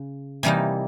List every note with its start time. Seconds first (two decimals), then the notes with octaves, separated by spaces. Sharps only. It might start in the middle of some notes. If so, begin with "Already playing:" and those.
Already playing: C#3
0.43 C3 E3 G3 A#3 D#4